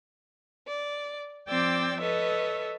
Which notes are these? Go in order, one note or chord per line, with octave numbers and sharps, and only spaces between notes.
D5
F3 C4 D5 G5 D6 E6
A4 B4 C#5 D#5 E5